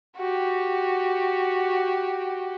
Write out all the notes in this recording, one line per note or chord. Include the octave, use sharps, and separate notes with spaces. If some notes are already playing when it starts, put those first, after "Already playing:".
F#4 G4